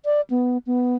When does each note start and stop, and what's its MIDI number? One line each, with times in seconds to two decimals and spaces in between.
0.05 0.21 74
0.30 0.58 59
0.66 0.96 59